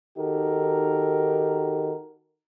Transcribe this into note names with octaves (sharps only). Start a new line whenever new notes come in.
D#3 D#4 F#4 G4 A4 A#4